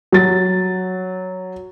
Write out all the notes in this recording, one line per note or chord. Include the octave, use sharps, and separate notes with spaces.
F#3 A6